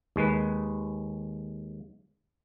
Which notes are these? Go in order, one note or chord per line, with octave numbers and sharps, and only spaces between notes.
D#2 G#3 B4